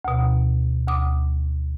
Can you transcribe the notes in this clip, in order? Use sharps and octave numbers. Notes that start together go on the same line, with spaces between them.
D2 B2
D2 D6 D#6